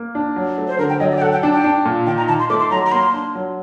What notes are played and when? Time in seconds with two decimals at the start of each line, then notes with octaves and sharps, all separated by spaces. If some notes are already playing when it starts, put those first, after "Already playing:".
Already playing: A#3
0.15 D4
0.36 F#3
0.58 A3
0.68 C5
0.79 D3 A#4
0.90 G5
1.00 F#3 D#5
1.11 D5
1.17 G5
1.22 A4 F#5
1.32 G5
1.43 D4 A5
1.53 G5
1.64 D4
1.85 A#2
2.07 D#3 G5
2.17 A#5
2.28 D#3 A5
2.39 C6
2.50 A3 D6
2.60 C6
2.71 F#3 A#5
2.86 A#5
2.92 A#3 C6
3.13 D4
3.35 F#3